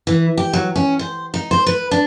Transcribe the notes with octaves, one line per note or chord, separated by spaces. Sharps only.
E3
G4
F#3
C#4
C5
D#4
C5
B4
D4